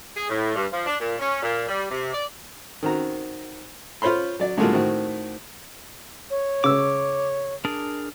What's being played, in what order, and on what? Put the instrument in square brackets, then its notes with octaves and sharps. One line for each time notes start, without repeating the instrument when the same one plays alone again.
[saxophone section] G#4
A2
G2
F3
D4
A#2
C#4
A#2
G3
C3
D5
[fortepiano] D#3 C4 F#4 A#5
F4 C5 C#5 B5 C6
F#3 D5
A2 D3 F#3 G#3 A#3 F4
A2 D#3 C4 F#4
[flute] C#5
[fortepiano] C#3 E6 [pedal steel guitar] D6
[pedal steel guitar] D4 G#4 A#4